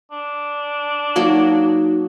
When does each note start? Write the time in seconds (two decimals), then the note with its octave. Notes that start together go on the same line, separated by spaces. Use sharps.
0.12 D4
1.16 F#3 A#3 D#4 F#4